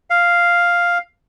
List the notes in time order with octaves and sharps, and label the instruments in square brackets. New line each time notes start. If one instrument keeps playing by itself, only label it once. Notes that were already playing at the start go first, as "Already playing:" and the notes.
[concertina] F5